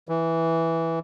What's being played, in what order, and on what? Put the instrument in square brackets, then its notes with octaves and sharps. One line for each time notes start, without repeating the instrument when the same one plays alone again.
[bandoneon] E3